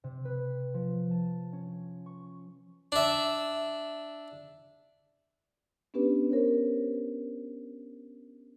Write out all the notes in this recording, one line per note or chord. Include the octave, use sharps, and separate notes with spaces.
C3
B4
F3
A5
C#4
C#6
D4 E5
B3 C#4 D4 G4 B4
A#4 C5 C#5